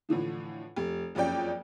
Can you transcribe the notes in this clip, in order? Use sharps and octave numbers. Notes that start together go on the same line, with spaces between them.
A2 D3 E3 F3
F1
F#1 F2 C#4 D5 G5